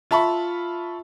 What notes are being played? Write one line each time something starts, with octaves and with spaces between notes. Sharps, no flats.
F4 E5 A5 B5 C#6